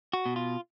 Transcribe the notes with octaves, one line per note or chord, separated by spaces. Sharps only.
F#4
B2
F4